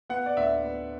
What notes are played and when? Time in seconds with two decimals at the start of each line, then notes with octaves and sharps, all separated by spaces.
0.10 B3 F#5
0.26 D5
0.37 D2 E5
0.63 B3